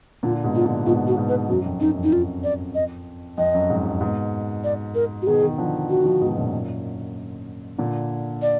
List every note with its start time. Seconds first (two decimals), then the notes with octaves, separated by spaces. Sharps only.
0.23 A#2 D3 F4
0.44 G#2 B2
0.55 F4
0.65 A#2 D3
0.86 G#2 B2 F4
1.07 F#4
1.17 G#2 B2
1.29 B4
1.49 F#2 F#4
1.66 F2
1.80 F#2 D#4
1.97 F2
2.04 D#4
2.13 F4
2.44 D5
2.75 D#5
3.38 F2 D#5
3.54 F#2
3.69 F2 G#2
3.85 F2
4.01 G#2 B2
4.64 D5
4.95 A#4
5.22 F#4
5.27 B2 D#3 G#4
5.43 B2 D#3
5.58 D3 F3
5.89 F#4
6.05 D3 F3
6.21 G#2 B2
6.36 F#2 A#2
7.78 A#2 D3
8.42 D5